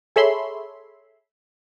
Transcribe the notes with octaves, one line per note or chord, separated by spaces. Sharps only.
G#4 A4 C#5 E5 B5 C6